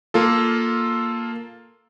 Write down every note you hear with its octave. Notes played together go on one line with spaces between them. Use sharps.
A#3 F4 A4